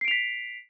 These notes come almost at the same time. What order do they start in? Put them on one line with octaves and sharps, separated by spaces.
C7 D7 F7 B6